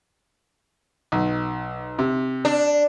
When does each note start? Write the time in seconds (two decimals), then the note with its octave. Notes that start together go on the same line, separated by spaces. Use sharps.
1.12 B1
1.99 C3
2.45 D4